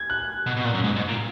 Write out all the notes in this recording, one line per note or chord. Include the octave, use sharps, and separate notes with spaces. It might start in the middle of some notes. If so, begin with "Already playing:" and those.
Already playing: G#6
F#6
B2
B2
A#2
F#2
G#2
G#2
A#2